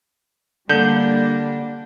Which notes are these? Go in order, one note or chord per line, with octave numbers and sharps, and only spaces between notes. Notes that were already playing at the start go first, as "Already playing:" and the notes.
D3 G3 A#3 D4 G6